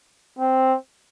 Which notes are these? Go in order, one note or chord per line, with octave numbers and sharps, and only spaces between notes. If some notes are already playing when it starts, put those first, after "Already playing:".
C4